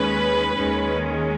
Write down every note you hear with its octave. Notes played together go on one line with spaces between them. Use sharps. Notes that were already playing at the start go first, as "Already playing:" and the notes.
Already playing: D#2 D#3 G#3 C#4 B4
D#2 D#3 G#3 C#4